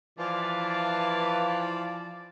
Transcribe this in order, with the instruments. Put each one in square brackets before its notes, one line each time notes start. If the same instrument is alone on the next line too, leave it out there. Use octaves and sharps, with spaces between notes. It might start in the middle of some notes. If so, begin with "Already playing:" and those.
[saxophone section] E3 [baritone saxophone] F3 [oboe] D5 [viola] F5 A5